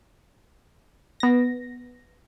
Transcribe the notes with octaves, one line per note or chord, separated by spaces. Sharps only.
B3 A#6